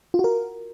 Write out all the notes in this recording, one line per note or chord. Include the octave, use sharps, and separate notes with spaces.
F4
F#4
A#4